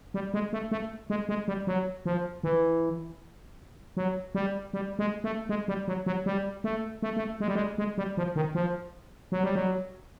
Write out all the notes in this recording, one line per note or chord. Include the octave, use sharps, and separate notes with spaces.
G3
G#3
A3
A3
G#3
G#3
G3
F#3
F3
E3
F#3
G3
G3
G#3
A3
G#3
G3
F#3
F#3
G3
A3
A3
A3
G#3
G3
G#3
G#3
G3
F3
D#3
F3
F#3
G3
F#3